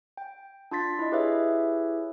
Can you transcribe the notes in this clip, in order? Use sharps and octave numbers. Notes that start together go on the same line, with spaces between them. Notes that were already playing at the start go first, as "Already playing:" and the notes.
G5
D4 F4 C6 A6 B6
E4 D#5
E4 G4 G#4 B4 C#5 E5